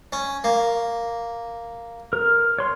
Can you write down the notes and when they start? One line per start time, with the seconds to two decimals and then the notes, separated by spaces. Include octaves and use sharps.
0.12 C#4
0.44 A#3
2.13 A#4
2.58 C#5 C6